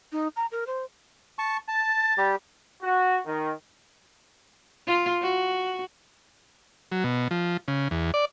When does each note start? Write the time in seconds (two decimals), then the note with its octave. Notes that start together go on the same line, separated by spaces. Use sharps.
0.12 D#4
0.36 A#5
0.52 A#4
0.67 C5
1.39 A5 C#6
1.68 A5 A6
2.18 G3 G4
2.83 F#4
3.25 D#3
4.87 F4
5.22 F#4
6.92 F#3
7.04 B2
7.31 F3
7.68 C#3
7.91 E2
8.14 D5